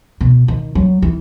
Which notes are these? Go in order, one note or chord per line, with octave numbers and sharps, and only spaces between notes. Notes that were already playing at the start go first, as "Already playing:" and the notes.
B2
D#3
F#3
E3